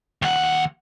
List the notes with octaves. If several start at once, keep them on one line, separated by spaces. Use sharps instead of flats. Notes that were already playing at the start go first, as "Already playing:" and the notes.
D#2 F#5